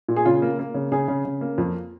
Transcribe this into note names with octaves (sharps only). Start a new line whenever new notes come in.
A#2
G#4
C#3 F4
A#3
A#3
C#3
C#3 G#4
C#3
C#3
A#3
F2